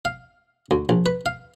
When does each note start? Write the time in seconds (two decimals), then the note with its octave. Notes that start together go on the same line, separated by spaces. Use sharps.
0.05 F5
0.71 D2
0.89 A#1
1.06 B4
1.26 F5